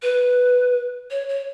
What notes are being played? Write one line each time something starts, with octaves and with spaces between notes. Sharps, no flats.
B4
C#5
C#5